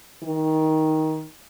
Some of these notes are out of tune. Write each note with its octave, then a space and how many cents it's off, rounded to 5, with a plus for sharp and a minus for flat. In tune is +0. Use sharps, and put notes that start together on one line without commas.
D#3 +15